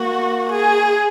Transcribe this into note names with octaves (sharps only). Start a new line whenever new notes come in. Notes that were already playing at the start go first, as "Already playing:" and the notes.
Already playing: A#3 F#4
G#4